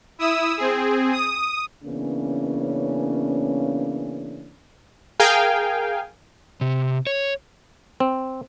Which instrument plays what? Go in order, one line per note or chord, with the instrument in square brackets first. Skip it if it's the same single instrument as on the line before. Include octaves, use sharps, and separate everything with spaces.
[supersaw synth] E4 D#6 E6
C4 G#4
D#6
[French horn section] C#3 E3 A#3 B3 C#4 D4
[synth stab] G#4 A#4 F5 G5 G#5
[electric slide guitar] C3
C#5
[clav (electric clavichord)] C4